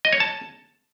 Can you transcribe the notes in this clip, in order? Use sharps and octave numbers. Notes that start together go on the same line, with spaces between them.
D#5
C#5
A5